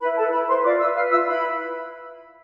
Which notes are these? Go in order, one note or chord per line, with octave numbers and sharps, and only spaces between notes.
E4 B4 B5
A4 B4 A5
E4 B4 B5
B4 C5 C6
F4 D5 D6
B4 E5 E6
B4 F5 F6
F4 E5 E6
E4 B4 B5